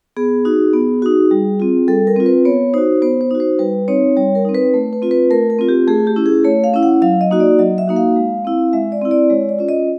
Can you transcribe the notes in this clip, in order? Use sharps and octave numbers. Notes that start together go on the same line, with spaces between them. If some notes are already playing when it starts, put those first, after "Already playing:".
B3 G#4
D#4 F#4
B3
D#4 F#4
G3
C4 F4
G3 A4
A#4
C4 F4
B4
B3 C#5
D#4 F#4 C5
B3 C5
C5
D#4 F#4
C5
G3 B4
C4 D#4 C#5
G3 C#5
A#4
C4 D#4
B4
A3
B4
C4 F4
B4
A3 A#4
A#4
C4 F4
G4
A3 G#4
G4
C#4 E4
G#4
A3 C#5
F5
C#4 E4
F#5
F#3 F5
D#5
A#3 D#4 F#4
D5
F#3 D#5
E5
A#3 D#4 F#4
F5
G#3
C4 E4
G#3 E5
D5
C4 E4
D5
G#3 C#5
D5
C#4 F4
D#5